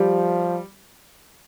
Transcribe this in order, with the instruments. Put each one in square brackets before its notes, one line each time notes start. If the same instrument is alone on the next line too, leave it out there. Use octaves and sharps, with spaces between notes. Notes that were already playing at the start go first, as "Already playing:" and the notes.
Already playing: [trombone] F3 [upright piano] G3